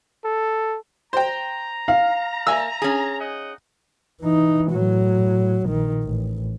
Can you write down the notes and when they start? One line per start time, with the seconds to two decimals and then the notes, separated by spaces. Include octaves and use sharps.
0.24 A4
1.13 C5 G5 A#5
1.88 F5
2.47 A#3 E5 G#5 E6
2.82 C#4 G#4
3.19 D#4 D#5 F#5
4.21 E3 D#4
4.72 A2 F#3
5.67 A#1 D#3
6.03 A1